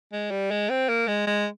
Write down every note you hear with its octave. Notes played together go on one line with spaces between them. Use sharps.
G#3
G3
G#3
C4
A#3
G#3
G#3